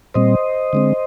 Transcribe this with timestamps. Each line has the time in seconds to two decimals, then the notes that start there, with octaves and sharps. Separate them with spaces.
0.14 A#2 G3 C4 C5 D#5
0.73 D3 G#3 C4